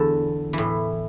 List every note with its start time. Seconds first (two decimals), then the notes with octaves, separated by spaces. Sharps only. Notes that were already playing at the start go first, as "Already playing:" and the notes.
Already playing: E2 D3 A4
0.53 A2 E3